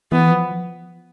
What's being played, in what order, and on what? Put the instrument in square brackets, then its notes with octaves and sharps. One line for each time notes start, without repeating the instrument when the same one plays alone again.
[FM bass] E3 [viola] B3
[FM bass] F3